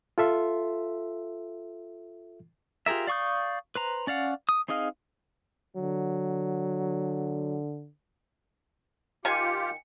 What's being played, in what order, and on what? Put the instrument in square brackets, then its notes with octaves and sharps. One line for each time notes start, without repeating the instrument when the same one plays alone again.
[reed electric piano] F4 A4 E5 C6
[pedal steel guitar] F4 G4 G#4 A#4 E5
D5 F5 C#6 D#6 G6
B4 C5 A#5
C#4 D5 F5 F#5
D#6
C4 D#4 G#4 D#5 F5
[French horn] D3 [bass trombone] F#3
[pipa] D#3 G#5 [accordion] F4 G4 [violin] C#7